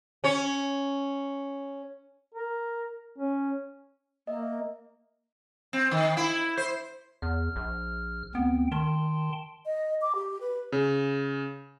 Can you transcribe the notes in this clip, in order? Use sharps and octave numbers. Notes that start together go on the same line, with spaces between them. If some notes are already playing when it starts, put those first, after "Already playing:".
C#4 C#5
A#4
C#4
A#3 D#5 E5
C4
D#3
E4
C5
E2 F6
A#1
D2 B3 C4 G5
D#3 G5 A5 C6
D#5
D6
G4
B4
C#3